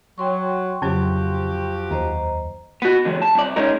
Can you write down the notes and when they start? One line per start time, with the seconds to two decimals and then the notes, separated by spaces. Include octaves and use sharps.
0.18 F#3 G5 C6 C#6
0.82 F2 C#3 F3 F#3 D4 F#4 G4
1.90 D#2 C5 D#5 A#5
2.82 B3 F#4
3.05 D3 E3 F#3 G#3
3.22 A5
3.35 C2 D5
3.56 G#2 G#3 C#4 D#4 A#4